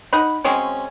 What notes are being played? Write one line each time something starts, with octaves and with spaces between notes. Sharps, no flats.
D#4 F#5 B5
F#3 G#3 C4 C#4